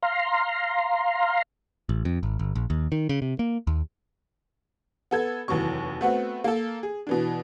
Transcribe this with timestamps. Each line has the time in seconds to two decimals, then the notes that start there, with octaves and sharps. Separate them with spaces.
0.03 F5 A#5 C6
1.89 A1
2.05 F2
2.23 G#1
2.39 G1
2.55 A#1
2.70 D#2
2.92 D#3
3.09 C#3
3.22 C3
3.39 A#3
3.67 D#2
5.11 B3 A4 G#6
5.48 F1 D#2 E3 F#3 C#6
6.01 A3 B3 C4 F#4
6.44 A#3 A4
6.83 G#4
7.07 B2 E3 D4